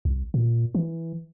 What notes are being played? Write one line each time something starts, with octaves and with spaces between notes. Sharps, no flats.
C2
A#2
E3